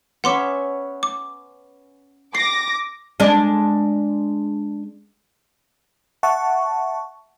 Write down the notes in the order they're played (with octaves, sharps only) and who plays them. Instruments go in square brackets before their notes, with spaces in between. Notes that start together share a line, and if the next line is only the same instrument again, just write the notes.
[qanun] B3 C#4 E5 [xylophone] F#5 C6 D6
[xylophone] D6
[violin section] D6 A#6 [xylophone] C7
[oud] G#3 D4
[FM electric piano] E5 F#5 A5 C#6